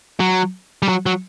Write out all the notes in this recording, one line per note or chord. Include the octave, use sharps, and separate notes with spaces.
F#3
G3
F#3
F#3